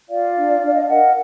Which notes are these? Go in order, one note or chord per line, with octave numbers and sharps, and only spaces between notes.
F4 D5 F5
D4
D4 D5
D#5
F5
A#4 D#5 F#5